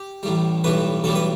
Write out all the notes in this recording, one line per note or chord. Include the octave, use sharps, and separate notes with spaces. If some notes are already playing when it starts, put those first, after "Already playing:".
Already playing: G4
A1 A2 G3
B1 A2 E3 G3 B4
B1 A2 E3 G3 A4
B4